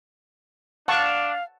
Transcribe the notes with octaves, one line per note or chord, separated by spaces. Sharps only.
D4 F5 F#5 A5 C#6